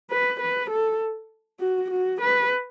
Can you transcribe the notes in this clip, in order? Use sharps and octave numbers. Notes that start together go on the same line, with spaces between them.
B4
B4
A4
F#4
F#4
B4